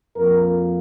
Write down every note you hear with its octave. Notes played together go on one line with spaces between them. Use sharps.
F2 F3 A#3 A#4